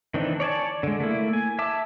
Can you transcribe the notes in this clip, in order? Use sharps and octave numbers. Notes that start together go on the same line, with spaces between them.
D#3 E3 C4 D4
C#5 D5 G#5 A5
D3 G#3
A3 A#3 E4
G#5
E5 A5 D6 E6